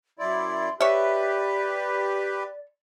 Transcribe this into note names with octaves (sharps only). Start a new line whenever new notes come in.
F#2 E4 D5 C6
G4 B4 C#5 D5 E5